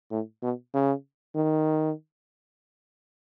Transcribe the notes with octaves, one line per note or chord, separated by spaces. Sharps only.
A2
B2
C#3
D#3